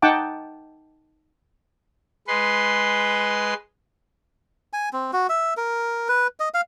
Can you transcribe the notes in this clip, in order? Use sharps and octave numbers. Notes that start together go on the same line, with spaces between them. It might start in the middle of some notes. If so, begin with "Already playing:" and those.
D#4 F#5 G5 A5 D6
G#3 B4 C6
G#5
C4
F#4
E5
A#4
B4
D#5
F5